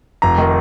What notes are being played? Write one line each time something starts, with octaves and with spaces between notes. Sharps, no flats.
F1 A#5
D#3